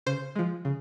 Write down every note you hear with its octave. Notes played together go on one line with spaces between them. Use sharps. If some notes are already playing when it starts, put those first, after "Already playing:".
C#3 C5
F3 G#3
C#3